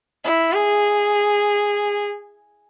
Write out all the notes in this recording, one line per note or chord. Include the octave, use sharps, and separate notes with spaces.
E4
G#4